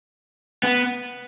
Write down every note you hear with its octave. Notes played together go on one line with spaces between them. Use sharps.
B3